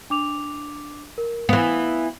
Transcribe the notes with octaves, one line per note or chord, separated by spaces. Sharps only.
D4 D6 F7
A#4
E3 B3 F5 F#6